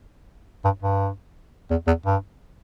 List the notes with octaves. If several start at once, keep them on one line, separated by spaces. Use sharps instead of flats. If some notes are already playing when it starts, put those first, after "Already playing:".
G2
G2
E2
E2
G2